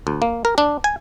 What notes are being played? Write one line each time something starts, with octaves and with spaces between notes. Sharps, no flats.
D2
A#3
A#4
D4
G#5